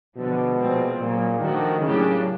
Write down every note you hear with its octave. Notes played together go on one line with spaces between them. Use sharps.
B2 D3 F3 G#3
A#2 F3 G#3 C4 F4
A#2 C#3 F#3 A#3
D#3 F3 A3 D4 F#4 A4
A2 C#3 F#3 A#3 D4 G4